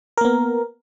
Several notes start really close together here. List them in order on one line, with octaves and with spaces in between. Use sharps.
A#4 A#3 B3